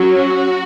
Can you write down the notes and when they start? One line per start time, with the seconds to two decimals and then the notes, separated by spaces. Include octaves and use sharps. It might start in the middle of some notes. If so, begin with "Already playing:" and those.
Already playing: F#3 C#4
0.10 F#4